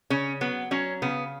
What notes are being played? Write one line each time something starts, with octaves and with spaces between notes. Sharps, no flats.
C#3 C#4
F#3 B3
F#3 C#4
C#3 B3